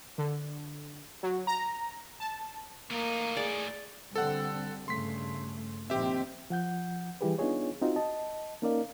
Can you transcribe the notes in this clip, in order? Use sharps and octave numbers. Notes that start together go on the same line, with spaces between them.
D3
F#3
A#5
A5
A2 A#3 D#4
G#4 D5
D3 G3 C4 A4 F#5
G2 C#3 A3 C6 B6
A#1 D#3 C4 G4 E5
F3 F#5 G6
E3 G3 E4 G4 G#4 B4
B3 D4 D#4 F4 G#4 C#5
C4 D#4 F4 F#4
D#5 A5
A#3 C#4 D#4 A#4 D5 F5